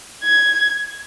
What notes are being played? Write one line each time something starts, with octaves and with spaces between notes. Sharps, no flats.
G#6